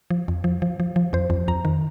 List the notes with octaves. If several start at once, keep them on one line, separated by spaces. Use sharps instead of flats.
F3
F2
F3
F3
F3
F3
F2 C5
F2
F2 A#5
D#3